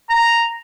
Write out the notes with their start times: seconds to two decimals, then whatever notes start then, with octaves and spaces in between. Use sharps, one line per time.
0.10 A#5